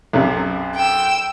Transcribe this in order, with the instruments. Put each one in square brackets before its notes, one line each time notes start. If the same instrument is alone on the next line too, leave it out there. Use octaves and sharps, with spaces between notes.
[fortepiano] B1 F#2 C3
[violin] G5 E6